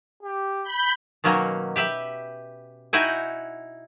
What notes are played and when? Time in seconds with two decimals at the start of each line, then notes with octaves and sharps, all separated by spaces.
0.23 G4
0.63 B5 G6
1.24 B2 D#3 F#3 A#3 C#4
1.76 G4 B4 E5 G5
2.93 D#4 E4 F#4 G5 G#5